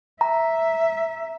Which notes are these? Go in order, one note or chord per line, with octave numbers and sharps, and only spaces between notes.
E5 A#5